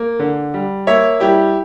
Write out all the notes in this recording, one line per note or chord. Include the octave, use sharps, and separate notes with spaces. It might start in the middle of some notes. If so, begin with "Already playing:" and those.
Already playing: A#3
D3
G3
A#3 C#5 E5
G3 E4 G4